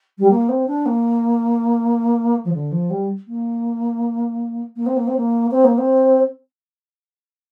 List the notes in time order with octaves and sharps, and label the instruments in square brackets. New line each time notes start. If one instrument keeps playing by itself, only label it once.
[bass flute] G3
A#3
C4
D4
A#3
F3
D3
F3
G3
A#3
A#3
C4
A#3
C4
A#3
C4
A#3
C4